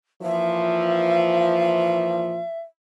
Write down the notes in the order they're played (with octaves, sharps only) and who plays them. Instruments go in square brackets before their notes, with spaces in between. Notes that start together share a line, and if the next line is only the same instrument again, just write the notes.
[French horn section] A#2 E3 F3 [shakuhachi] E5